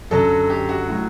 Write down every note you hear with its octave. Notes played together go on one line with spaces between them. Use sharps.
F#2 D3 F#3 A4
G4
F#4
A2 F#3